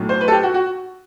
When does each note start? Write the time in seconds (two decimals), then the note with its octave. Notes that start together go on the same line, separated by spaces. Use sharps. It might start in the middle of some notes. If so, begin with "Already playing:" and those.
Already playing: B1 A2 F#3
0.09 C5
0.21 B4
0.28 A4
0.32 G4
0.43 F#4
0.54 F#4